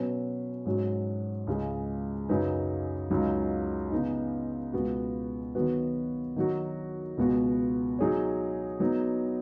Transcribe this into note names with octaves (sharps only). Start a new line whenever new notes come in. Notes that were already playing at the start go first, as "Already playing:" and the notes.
Already playing: B2 F#3 C#4 B4
G#2 F#3 C#4 F#4
C#2 C#3 G#3
F#2 C#3 F#3 D#4 B4
C#2 C#3 F#3 D#4
C#3 B3 D#4
C#2 B2 B3 F#4
D#3 F#3 B3 F#4 B4
D#3 F#3 D#4 F#4
C#2 B2 B3 F#4
F#3 D#4 G#4 C#5
F#3 B3 D#4